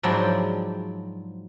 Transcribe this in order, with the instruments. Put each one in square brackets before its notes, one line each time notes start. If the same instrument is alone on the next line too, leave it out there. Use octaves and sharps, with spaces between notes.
[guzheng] G#2 F3 F#3 D4 E4 G5